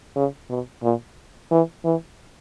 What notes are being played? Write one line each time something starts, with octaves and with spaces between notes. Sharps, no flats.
C#3
B2
A#2
E3
E3